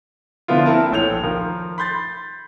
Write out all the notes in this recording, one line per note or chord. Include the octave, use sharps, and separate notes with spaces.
D3 F3 B3 E4 F4
A#3 C4 E4 A#4 A5
A#1 A2 C#5 G6 F7
D#3 F3 A#4
B5 C6 G6 A6